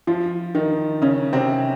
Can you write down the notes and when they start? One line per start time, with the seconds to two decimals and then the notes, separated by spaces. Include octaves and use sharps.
0.07 F3 F4
0.55 D#3 D#4
1.02 C#3 C#4
1.33 C3 C4